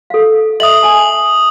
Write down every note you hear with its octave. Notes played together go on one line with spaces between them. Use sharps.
A4 F5
D#5 E5 D#6 F#7
G#5 A5